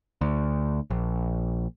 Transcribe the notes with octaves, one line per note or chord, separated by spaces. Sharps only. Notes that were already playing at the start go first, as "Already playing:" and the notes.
D2
A#1